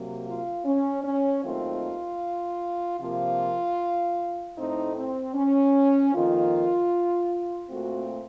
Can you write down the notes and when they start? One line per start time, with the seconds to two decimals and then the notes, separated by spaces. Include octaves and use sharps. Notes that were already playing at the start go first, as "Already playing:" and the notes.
Already playing: C3 F#3 A#3
0.26 F4
0.65 C#4
1.04 C#4
1.43 D#2 D#3 F#3 A3 C4 F4
2.99 C3 F3 A#3 F4
4.56 A2 A3 C4 D#4
4.95 C4
5.34 C#4
6.13 F2 D#3 A#3 F4
7.68 A#2 A3 C4 F#4